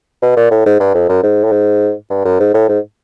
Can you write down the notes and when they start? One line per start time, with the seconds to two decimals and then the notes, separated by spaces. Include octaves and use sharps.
0.23 B2
0.37 A#2
0.51 A2
0.66 G#2
0.80 G2
0.95 F2
1.09 F#2
1.23 G#2
1.44 A2
1.52 G#2
2.10 G2
2.25 F#2
2.40 G#2
2.54 A2
2.69 G#2